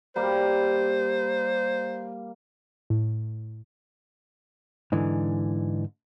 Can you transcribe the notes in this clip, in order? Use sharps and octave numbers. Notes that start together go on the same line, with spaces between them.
G3 A#3 C5
A2
G#2 D3 E3